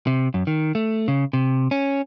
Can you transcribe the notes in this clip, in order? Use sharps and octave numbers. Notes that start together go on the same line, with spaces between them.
C3
F#2
D#3
A3
C#3
C3
C#4